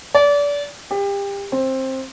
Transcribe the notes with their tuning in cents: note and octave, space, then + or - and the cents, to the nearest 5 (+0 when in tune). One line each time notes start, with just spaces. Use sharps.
D5 -30
G4 +30
C4 +15